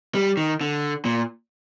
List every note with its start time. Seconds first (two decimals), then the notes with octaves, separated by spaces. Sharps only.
0.15 G3
0.37 D#3
0.61 D3
1.05 A#2